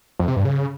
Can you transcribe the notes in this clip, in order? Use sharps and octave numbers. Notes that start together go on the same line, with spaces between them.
F2
C3
G2
C#3